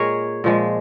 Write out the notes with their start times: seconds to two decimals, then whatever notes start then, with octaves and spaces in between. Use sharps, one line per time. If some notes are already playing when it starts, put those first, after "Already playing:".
Already playing: A#2 G#3 G#4 A#4 C#5
0.44 A#2 F3 G#3